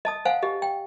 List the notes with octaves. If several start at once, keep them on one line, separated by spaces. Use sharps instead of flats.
D#5 A5 D#6
C5 F5 F#5 G#5
G4 D#5
G5